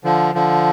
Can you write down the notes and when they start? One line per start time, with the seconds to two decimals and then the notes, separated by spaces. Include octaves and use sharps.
0.04 D3 F3
0.35 D3 F3